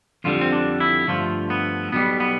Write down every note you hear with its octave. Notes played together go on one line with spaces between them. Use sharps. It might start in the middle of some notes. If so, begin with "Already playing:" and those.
F2 D3 G3 F4
C4
D4
E4
G2 D3 F3 A3 F4
B3
B1 B2 G3 B3
B3